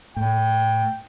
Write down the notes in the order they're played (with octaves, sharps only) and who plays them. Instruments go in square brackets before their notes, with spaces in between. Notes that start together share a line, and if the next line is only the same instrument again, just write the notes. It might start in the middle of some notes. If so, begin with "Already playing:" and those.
[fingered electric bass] A2 [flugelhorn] G5